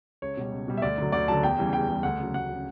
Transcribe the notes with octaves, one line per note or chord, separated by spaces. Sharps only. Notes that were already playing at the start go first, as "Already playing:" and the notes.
C#2 C#5
B2 G3
C#2
B2 G3
E5
D2 D5
D3 F#3
D2 D5
D3 F#3 A5
E2 G5
C#3 E3 G3
E2 G5
C#3 E3 G3
D2 F#5
C#3 F#3
D2 F#5
C#3 F#3